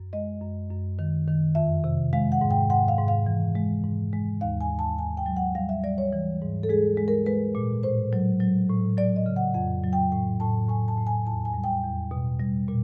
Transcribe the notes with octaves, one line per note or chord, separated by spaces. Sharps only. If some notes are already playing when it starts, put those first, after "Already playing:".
Already playing: F#2
G#3 D#5
F#2
F#2
D#3
D#3
F2 E5
C3
G#3 F5
F#5
G#2
G5
G#2 F#5
F5
G#2
F5
E3
G#3
G#2
G#3
D#2 F5
G#5
D#2
A5
D#2 G#5
G5
F#3
F#5
G3 F5
E5
G3 D5
C#5
E3
G#2
A4
G#3 G#4
G#3
A#4
G#3 B4
A#2
A2 C5
F#3
F#3
A2
F#3 D5
D#5
C#3
F#5
F2 F#5
F#3
G5
A2 G5
A2 A5
A2 G#5
A5
A2
G#5
E2 A5
G#5
G3
G5
E2
B2
G3
A#2